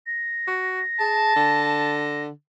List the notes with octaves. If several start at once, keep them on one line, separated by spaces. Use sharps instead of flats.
A#6
F#4
G#4 A5
D3